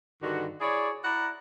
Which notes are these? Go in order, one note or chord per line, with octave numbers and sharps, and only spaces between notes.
G2 D3 D#3 F#4
E4 G#4 C#5 D5
E4 D5 F#5 A#5